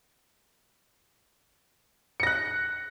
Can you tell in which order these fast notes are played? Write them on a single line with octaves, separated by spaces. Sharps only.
C#7 A#6 F#6